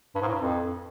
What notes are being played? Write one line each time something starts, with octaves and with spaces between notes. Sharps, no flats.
G2
G#2
A2
G2
F2